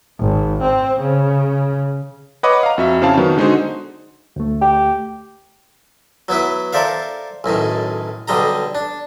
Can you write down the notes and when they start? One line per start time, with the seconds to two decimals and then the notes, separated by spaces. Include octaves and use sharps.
0.19 G#1
0.63 C4
1.01 C#3
2.43 B4 C#5 D#5 F#5 B5 D6
2.63 F5 A#5
2.78 F2 F#4 E5
3.01 C#3 C4 E4 G#4 F5 A5
3.17 D#3 F#3 B3
3.37 D3 G#3 D#4 F#4 G#4 C5
4.36 D2 A3
4.61 G4
6.28 F#3 B3 E4 B4
6.73 A4 A#4 C5 D5 E5 F5
7.44 B1 F#2 A2 D#3
8.28 B1 D3 G3 D#5 A#5
8.75 D4